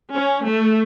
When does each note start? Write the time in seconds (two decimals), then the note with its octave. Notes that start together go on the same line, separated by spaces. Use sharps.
0.12 C#4
0.45 A3